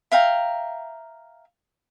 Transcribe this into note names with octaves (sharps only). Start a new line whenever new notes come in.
E5 F5 G5 A#5